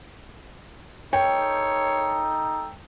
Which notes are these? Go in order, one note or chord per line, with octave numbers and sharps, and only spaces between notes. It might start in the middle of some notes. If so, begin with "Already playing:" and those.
D#4 A4 C#5 G5